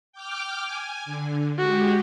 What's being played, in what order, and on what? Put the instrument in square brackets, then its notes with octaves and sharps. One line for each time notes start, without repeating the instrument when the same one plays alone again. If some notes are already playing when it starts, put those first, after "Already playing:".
[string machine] G5 D6 F6
G#5
D3
[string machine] G#3 G4 [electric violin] F#4